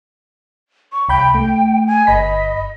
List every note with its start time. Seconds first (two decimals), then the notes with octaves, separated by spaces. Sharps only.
0.92 C#6
1.09 C2 G5 B5 G6
1.34 A3
1.87 G#5
2.07 G1 D#5 B5 B6